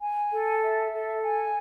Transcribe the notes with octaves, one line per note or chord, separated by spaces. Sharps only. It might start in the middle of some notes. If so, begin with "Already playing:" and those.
G#5
A4
E5
A4
G#5